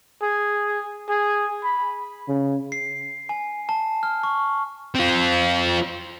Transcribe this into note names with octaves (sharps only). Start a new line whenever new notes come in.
G#4
G#4
B5
C#3
C7
G#5
A5
F6
C#6
C4 F4